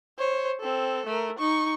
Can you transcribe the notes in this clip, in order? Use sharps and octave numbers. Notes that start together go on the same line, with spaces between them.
C5 C#5
C4 A4
A3 A#4
D#4 C#6